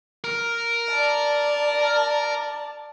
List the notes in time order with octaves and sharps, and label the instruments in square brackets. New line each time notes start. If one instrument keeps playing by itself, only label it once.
[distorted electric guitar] A#4
[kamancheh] D5 A5